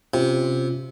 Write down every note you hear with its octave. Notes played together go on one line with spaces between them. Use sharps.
C3 C#4 F4